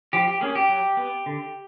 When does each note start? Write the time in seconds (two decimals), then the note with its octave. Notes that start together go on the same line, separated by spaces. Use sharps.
0.13 F3 G4
0.28 G4
0.41 A#3 C#4 G#4
0.55 G4
0.69 F#3
0.97 B3
1.26 D3